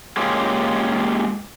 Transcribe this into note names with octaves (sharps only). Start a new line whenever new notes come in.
G#3 A#3 C#4 F4 G4